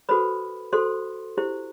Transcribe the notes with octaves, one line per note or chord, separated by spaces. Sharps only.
F#4 A4 B4 C5 B5
F#4 A4 C5 C6
E4 G4 C5